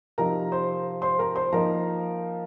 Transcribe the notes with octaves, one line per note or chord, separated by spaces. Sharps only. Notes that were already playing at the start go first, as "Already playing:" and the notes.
C3 F3 C4 D#4 A#4 A#5
C5 C6
C5 C6
A#4 A#5
C5 C6
F3 A#3 D#4 A#4 A#5